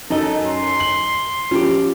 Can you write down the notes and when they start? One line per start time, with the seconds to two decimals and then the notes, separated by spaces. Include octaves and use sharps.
0.10 F#2 D#4 A4 D#5
0.46 C6
0.80 F#7
1.51 F3 C#4 G4